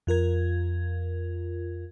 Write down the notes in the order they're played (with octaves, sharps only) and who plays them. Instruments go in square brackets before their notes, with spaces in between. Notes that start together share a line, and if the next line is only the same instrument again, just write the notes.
[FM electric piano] F2 F4 A#4 G#6